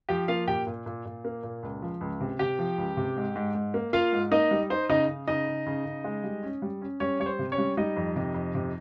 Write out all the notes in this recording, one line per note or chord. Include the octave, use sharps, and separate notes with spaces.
F3 G4 G5
A#3 F4 F5
A#2 G4 G5
A#2
A#2
A#2
A#3
A#2
C#2
F3
C#2
C3
C3 G4 G5
F3
C#2
C3
G#2
G#2
G#2
A#3
A#3 F4 F5
G#2
A#3 D#4 D#5
G3
D#4 C5
C#3 D#4 D#5
C#3
C#3 D#4 D#5
C#3
C#3
C#3
G#3
G3
C#4
G3
C#4
G3 C#4 C#5
G3 C#5
C5
C3
C#4 C#5
G3
G3 D#4 D#5
F2
C3
F2
C3